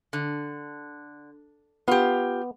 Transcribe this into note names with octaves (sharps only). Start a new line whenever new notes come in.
D3
B3 F4 G4